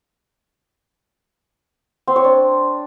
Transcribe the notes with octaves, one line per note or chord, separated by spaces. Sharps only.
C4
C#5
D4